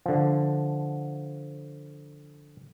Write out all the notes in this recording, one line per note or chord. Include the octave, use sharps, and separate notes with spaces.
D3 F3